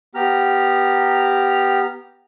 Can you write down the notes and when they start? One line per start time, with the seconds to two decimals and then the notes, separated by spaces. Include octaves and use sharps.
0.15 B3 G4 A#5 F6